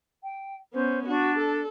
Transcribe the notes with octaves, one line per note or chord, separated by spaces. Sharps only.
G5
B3 C#4 C5
D4 F#4
A4